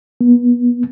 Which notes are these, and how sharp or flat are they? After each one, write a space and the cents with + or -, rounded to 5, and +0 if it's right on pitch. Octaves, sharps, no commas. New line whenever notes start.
B3 -30